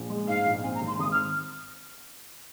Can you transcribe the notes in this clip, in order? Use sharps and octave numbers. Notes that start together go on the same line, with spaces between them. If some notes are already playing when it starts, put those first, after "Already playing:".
Already playing: A#1
G#3
G#2 F5
A#1
C4 G#5
A#5
G#1
C6
G#1 D#6
F6